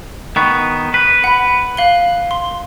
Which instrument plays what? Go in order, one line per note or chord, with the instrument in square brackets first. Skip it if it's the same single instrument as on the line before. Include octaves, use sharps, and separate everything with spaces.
[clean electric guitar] D#3 B3 [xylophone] C#6
[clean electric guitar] B4
[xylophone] F#5 B5
F5 F#7 G7
C6